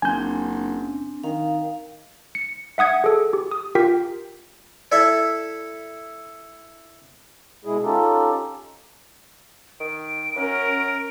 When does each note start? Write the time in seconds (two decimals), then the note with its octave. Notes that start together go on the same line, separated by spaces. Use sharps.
0.02 F#1 C4 D4 G#5 G6
1.24 D#3 F5
2.35 C#7
2.78 E5 F#5 D#6 G#6 C#7
3.04 G#4 A4
3.33 G4
3.51 D#6
3.75 F4 G4 A#4 G5 B6
4.92 E4 A4 D5 E5
7.65 B2 G#3 E4 G#4
7.84 C#4 D#4 F4 G4 A4
9.80 D#3 D7
10.36 F#2 C#4 A#4